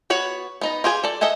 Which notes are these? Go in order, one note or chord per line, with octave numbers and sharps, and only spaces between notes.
B3 F#4 C#5 F#5
B3 D#4 D#5
F4 G4 G#4 G#5
A4 D5
A4 D#5 E5 F#5 G#5